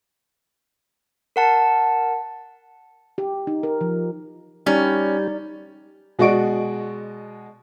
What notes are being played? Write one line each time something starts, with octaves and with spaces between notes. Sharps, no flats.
A#4 F#5 A5
G4
D#4
A#4
F3
G3 C#4 D#4 D5
B2 G#3 F#4 D5 C#6 D7